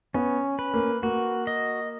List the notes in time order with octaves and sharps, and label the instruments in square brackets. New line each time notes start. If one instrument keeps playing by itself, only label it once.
[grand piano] B3 [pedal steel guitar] C#4
[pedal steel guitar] B4
[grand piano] A#3
[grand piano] A#3 [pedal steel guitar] F#4
[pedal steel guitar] D#5